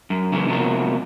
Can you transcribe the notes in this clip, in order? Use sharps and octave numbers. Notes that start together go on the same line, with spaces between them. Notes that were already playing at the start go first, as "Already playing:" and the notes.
F#2
F#2 C#3 E3
C3 F3 F#3 A#3